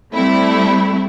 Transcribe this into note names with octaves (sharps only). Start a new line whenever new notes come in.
G3 A3 C4 E4